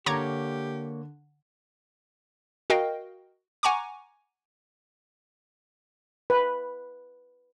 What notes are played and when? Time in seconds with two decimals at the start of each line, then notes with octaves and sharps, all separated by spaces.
0.06 D3 A#3 G4 C#5 A#5 D6 G#6
2.70 F#4 A#4 D#5 F5 G5
3.63 F#5 G#5 A#5 C#6 D6
6.30 B4